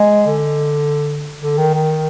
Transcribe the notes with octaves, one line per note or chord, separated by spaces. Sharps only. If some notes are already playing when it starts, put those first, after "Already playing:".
Already playing: G#3
D3
D3
D#3
D#3